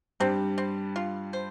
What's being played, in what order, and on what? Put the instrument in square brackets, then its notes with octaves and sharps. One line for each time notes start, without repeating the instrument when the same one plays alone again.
[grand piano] G2 G3 [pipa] C4
[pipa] C4
F4
C5